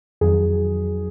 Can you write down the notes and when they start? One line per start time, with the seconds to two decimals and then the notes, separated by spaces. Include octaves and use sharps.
0.21 F2 D#3 F#3 G#4